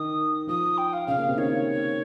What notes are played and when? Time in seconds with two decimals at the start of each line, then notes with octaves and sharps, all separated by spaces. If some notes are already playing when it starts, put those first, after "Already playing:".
Already playing: D#3 D#4 D#6
0.47 F3 F4 D#6
0.77 G5
0.92 F5
1.07 C#3 C#4 F5
1.18 A#3
1.27 C3 C4
1.37 D#3 D#4 C#5